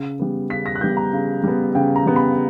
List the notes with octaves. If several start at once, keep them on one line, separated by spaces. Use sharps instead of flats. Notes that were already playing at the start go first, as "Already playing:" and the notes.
Already playing: C#3
G3 B3
C#3 B6
A#6
F#6
G3 B3 G6
A#5
C#3
G3 B3
C#3 G5
A#5
G3 B3
B5